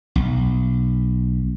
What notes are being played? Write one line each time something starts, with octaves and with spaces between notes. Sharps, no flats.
B1